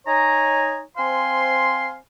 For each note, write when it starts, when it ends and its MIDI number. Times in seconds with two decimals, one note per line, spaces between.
0.07 0.80 63
0.07 0.80 73
0.07 0.80 80
0.07 0.80 82
0.98 1.96 60
0.98 1.96 72
0.98 1.96 77
0.98 1.96 80
0.98 1.96 84